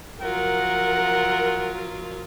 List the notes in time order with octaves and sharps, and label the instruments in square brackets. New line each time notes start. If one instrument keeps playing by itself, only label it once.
[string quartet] F3 F#3 F4 [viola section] A#4 [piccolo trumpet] F#5